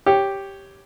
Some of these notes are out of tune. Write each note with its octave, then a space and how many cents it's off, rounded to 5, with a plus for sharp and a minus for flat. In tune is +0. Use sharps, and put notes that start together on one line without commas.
G4 +0 C#5 +0